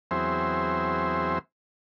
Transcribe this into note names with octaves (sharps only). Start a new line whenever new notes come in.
E2 F#3 C4 G#4 C5 E5